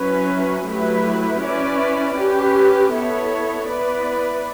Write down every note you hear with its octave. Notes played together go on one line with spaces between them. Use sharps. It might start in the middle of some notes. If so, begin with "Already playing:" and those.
Already playing: F#3 C#4 E4 B4
F#3 A3 E4 G4 B4
C#4 E4 B4 D5
C#4 G4 B4
B3 E4 A4 C#5
B3 E4 B4 D5